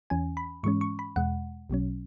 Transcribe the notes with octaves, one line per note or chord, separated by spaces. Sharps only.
E2 E3 C#4 G#5
B5
G#2 E3 G#3 C#4 C#6
C#6
B5
E2 B2 G#3 F#5
B1 B2 F#3 C#4